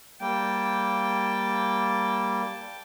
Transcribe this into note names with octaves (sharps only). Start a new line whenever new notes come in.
G3 A#3 G5 A5